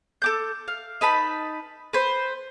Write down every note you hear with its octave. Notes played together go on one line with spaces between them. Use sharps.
A4 D6 G6
F5
D#4 B4 A5 B5
B4 C5